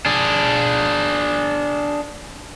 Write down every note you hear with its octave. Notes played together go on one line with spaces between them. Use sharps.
D4 G#4